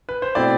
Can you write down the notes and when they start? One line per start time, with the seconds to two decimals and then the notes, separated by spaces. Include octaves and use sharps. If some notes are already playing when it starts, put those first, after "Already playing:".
0.09 B4
0.22 C5
0.35 B2 A3 C4 E4 D5